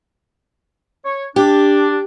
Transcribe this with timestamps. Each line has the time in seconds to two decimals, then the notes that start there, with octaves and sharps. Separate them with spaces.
1.05 C#5
1.36 D4 G4